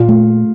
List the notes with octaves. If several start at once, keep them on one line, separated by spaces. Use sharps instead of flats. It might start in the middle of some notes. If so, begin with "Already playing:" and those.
Already playing: A#2 F4
A3